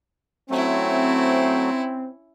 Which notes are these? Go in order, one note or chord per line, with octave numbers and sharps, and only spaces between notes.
F#3 A3 C4 C#4 E4